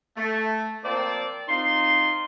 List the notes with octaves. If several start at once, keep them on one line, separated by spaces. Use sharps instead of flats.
A3
F3 A#3 C4 C5 D5
C4 D#4 F4 C6